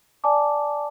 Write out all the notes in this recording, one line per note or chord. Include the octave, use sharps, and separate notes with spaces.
D5 G#5 A5 D6